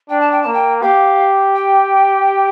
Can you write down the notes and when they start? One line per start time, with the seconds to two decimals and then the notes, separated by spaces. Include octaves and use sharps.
0.09 D4 G5
0.20 A5
0.32 G5
0.42 A#3 A5
0.54 G5
0.82 G4 F5
1.56 G5